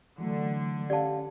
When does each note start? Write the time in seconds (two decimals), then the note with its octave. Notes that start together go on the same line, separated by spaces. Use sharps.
0.18 D3 E3 F#3 A3
0.90 C#4 G4 D5 F5 A5